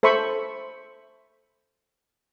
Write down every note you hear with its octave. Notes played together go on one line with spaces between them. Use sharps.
A4 C5 E5 B5 C#6